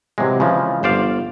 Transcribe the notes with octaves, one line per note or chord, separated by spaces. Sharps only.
C3 E3 F#3 G#3
C#3 E3 F3 G#3
G1 C5 D5 F5